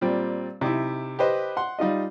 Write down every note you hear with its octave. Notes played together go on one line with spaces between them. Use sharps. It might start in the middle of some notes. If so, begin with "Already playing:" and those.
A#2 G3 C4
C3 D#4 E4
G4 B4 C5 D#5
F#5 C6
G3 D#4 F4 D#5